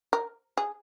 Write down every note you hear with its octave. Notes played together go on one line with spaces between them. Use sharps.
A#4
G#4